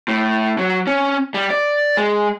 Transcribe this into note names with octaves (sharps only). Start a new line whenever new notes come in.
A2
F#3
C#4
G3
D5
G#3